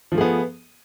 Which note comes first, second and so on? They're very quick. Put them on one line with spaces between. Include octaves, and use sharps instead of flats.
F3 A3 G#4 B3